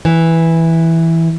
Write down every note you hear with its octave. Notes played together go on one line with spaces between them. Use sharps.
E3